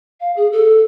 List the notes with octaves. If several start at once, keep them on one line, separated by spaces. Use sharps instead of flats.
F5
G#4
A4